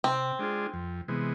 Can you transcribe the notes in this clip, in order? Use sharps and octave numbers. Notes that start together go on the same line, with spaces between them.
C3 C4
G#3 D4 F4 G#4
F2
C3 E3 G#3 B3